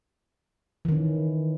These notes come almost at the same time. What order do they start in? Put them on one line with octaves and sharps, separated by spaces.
E3 D#3 C#4